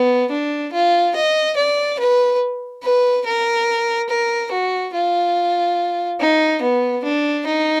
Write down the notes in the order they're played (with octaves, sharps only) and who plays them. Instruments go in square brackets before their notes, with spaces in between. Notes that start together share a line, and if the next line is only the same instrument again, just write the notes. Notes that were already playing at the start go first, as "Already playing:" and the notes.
Already playing: [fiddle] B3
D4
F4
D#5
D5
B4
B4
A#4
A#4
F#4
F4
D#4
B3
D4
D#4